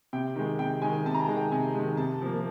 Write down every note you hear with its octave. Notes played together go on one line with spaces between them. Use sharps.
C3 G5
D#3 G#3
C3 G5
D#3 G#3 G#5
C3 A5
A#5
A5
D#3 G#3
G5
C3 G#5
D#3 G#3
C3 A5
F3 A#3